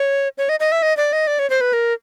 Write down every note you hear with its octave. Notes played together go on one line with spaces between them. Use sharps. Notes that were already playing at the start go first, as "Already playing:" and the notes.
Already playing: C#5
C#5
D#5
D#5
E5
D#5
D5
D#5
D5
C#5
C5
B4
A#4